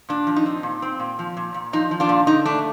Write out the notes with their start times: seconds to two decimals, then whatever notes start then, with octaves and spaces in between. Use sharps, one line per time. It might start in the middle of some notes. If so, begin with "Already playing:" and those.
0.09 A#2 D4
0.27 F3
0.36 D#4
0.46 C4
0.63 A#2
0.82 C4
0.99 A#2
1.19 F3
1.37 A#2
1.54 A#2
1.73 F3 D#4
1.91 F3
2.00 D4 F4
2.09 A#2
2.27 D3 D#4
2.46 A3 D4